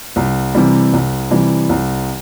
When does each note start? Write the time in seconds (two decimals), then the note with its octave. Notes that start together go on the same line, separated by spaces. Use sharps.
0.16 C2
0.55 C3 E3 G3
0.93 C2
1.31 C3 E3 G3
1.69 C2